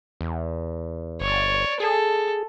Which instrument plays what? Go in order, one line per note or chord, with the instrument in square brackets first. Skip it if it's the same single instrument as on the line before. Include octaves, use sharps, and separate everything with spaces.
[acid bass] E2
[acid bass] G1 [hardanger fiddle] C#5 D5
[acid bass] G#4 [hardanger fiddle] A4